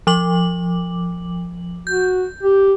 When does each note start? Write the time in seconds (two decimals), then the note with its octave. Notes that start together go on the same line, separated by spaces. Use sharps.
0.07 F3 D6 F#7
1.87 F#4 G6
2.43 G4